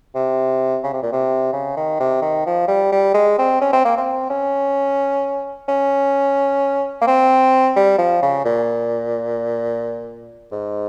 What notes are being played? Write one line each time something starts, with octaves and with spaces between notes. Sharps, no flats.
C3
C#3
C3
A#2
C3
C#3
D#3
C3
D#3
F3
G3
G3
G#3
C4
C#4
C4
A#3
C4
C#4
C#4
A#3
C4
G3
F3
C#3
A#2
G#2